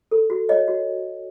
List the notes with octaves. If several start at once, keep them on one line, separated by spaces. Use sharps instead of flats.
A4
F#4
C#5 D#5
F#4